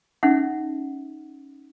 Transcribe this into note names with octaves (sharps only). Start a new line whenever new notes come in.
C#4 D#4 E5 F#5